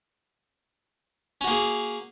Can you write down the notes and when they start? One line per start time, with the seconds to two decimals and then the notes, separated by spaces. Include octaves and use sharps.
1.41 C#4
1.44 F#4
1.47 A#3
1.50 G#4